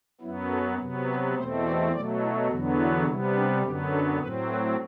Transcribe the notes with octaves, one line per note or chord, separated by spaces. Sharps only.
F#2 F#3 B3 E4
A4
C3 F#3 B3
B4
E2 B2 A3 C4 C5
D5
B2 F#3 A3 D5
E4
E2 D3 F#3 B3 F#4
E4
C3 G3 B3 E4
D4
F#2 D3 F#3 B3 G4
A4
A2 F#3 C4 B4
B4